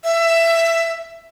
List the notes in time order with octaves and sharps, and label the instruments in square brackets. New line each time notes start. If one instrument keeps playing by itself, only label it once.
[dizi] E5